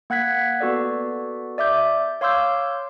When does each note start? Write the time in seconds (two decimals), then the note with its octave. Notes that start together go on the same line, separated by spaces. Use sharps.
0.10 A#3 F#5 F#6 G#6 B6
0.60 B3 F#4 A4 D5
1.58 D5 E5 D6 G6
2.21 C#5 F5 C6 D6 E6 G6